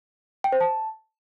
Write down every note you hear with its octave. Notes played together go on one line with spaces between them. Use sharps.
G5
C5
A5